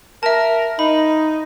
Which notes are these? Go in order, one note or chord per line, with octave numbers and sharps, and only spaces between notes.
A#4 E5 A5
D#4 B5